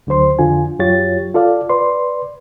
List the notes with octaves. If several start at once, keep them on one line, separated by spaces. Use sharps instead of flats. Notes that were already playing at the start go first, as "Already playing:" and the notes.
D2 D3 F#3 C5 C6
F2 D3 F4 G#5
F#2 F#3 F4 G4 C#5 A6
F4 A4 D5 F5
B4 D5 C6